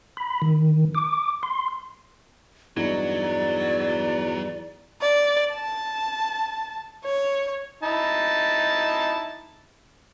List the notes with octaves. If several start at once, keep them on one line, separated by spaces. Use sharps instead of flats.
B5
D#3
D6
C6
E2 G2 F#3 D#4 D5
D5
A5
C#5
D#4 E4 A5